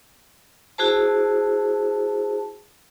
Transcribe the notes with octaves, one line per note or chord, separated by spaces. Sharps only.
E4 F#4 G#4 C5 A5